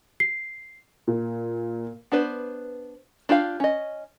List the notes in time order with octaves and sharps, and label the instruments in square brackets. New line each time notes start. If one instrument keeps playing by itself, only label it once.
[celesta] C7
[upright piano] A#2
[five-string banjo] B3 D4 B4 C5
D4 F4 G4 F5
C#4 D#5